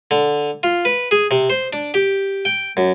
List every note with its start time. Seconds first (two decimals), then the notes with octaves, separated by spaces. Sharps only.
0.11 D3
0.63 F4
0.85 B4
1.11 G#4
1.31 C3
1.50 C5
1.73 D4
1.94 G4
2.45 G5
2.77 F#2